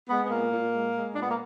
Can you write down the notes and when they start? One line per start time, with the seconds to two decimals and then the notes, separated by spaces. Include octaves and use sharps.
0.09 G#3 B3
0.26 B3
0.30 A#2 A#3
0.51 A#2
0.73 G#3
0.94 G#3
1.15 A#2 D4
1.22 B3
1.29 A#3